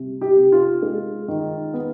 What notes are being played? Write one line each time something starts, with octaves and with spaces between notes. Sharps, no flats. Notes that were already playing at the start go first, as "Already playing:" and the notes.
Already playing: C3 G3
G4
C3
F4
G#3
D#3
B3